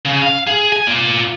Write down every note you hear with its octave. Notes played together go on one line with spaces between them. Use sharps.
C#3
F5
G#4
G#5
F4 D5